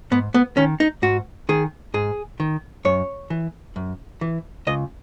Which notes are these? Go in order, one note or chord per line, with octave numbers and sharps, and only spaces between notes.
G#2 B3
B3
D#3 C#4
D#4
G#2 F#4
D#3 G#4
G#2 G#4
D#3
F#2 C#5
E3
F#2
E3
C#2 D#5